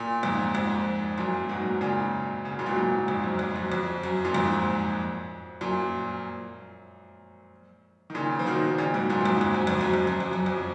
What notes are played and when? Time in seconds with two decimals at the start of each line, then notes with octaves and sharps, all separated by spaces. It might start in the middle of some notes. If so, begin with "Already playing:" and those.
Already playing: A#2
0.23 F2 G#2
0.54 F2 G#2
1.18 F#2 A#2
1.49 G#2 B2
1.81 A#2 C#3
2.45 C#3
2.52 B2
2.59 A#2
2.66 G#2 B2
2.76 F#2 A#2
3.08 F2 G#2
3.24 F#2
3.39 F2
3.56 F#2
3.72 F2
4.03 F#2
4.25 A#2
4.34 F2 G#2
5.61 F#2 A#2
8.10 D#3
8.15 A#2 C#3
8.39 F3
8.46 B2 D#3
8.78 A#2 C#3
8.94 G#2 B2
9.10 F#2 A#2
9.21 F#2
9.25 F2 G#2
9.41 F2
9.54 F#2
9.67 F2
9.81 F#2
9.94 F2
10.07 F#2
10.20 F2
10.33 F#2
10.46 F2